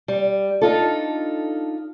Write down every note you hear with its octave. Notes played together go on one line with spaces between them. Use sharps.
G3
D4 D#4 F4 A4